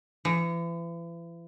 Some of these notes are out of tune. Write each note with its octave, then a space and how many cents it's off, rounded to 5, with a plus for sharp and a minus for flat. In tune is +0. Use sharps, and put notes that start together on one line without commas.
E3 +40